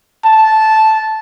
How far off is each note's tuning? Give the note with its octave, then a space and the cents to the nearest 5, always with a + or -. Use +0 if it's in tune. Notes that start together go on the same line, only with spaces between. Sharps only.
A5 -10